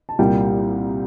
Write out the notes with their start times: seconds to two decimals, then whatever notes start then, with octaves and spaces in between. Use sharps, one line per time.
0.09 A5
0.19 C2 A#2 G3 G5